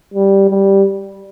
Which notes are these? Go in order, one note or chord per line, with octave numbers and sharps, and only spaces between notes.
G3
G3